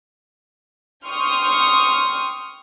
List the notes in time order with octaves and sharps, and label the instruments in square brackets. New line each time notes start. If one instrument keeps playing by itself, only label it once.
[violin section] G5 C6 C#6 D#6 F6